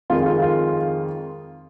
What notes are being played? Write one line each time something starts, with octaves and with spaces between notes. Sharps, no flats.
F2 D#3 G#3 F4
F4
F4